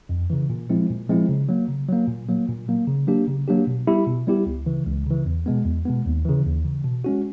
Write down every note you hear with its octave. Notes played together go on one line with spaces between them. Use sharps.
F2
C#3 E3
A#2
F3 G#3 C4 E4
A#2
F3 G#3 C4 E4
C#3
F#3 A#3
C#3
F#3 A#3
A#2
F#3 A#3
A#2
F#3 A#3
C#3
F#3 A#3 D4 G4
C#3
F#3 A#3 D4 G4
B2
G3 B3 E4 G4
B2
G3 B3 E4 G4
C#2
C#3 E3
C#2
C#3 E3
E2
B2 G#3 B3
E2
B2 G#3 B3
D#2
C#3 E3
D#2
C#3 E3
B2
G#3 C#4 F#4